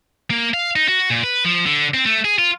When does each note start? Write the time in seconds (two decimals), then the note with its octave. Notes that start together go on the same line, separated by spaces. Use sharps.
0.30 A#3
0.54 F5
0.76 D#4
0.88 F#4
1.10 A#2
1.24 B4
1.45 F3
1.66 D3
1.94 C4
2.06 A3
2.25 G#4
2.38 F4